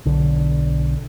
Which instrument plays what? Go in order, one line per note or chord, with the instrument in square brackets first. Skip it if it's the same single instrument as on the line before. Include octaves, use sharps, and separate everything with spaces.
[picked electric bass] B1 D3